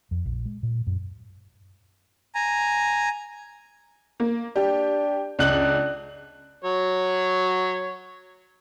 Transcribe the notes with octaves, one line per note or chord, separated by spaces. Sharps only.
F2
A#1
G#3
A#2
F#2
G#5 A#5
A#3
D4 G4
C#2 D4 F#6 F#7
F#3 C#5